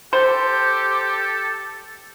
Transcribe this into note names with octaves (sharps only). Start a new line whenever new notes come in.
G4 A4 C5